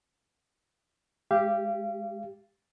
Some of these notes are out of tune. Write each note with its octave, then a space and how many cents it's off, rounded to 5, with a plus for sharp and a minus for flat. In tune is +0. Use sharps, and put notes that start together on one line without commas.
G#3 +0 G4 +0 F5 -35